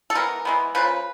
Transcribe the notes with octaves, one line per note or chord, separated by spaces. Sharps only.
A4
E3 G#3 B3 A#4
E3 G#3 B3
C#3 F3 A#3 B4